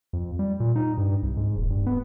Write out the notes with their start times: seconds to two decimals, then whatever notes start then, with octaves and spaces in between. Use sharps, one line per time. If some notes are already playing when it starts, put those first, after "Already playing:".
0.13 F2
0.39 G3
0.60 A#2
0.76 D#4
0.98 G2
1.23 C2
1.37 G#2
1.57 D#1
1.70 G2
1.87 B3